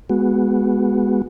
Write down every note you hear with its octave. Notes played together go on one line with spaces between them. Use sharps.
G#3 B3 F#4